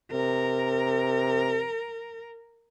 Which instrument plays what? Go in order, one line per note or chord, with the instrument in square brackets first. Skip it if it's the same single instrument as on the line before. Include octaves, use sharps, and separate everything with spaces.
[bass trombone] C3 [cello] A#4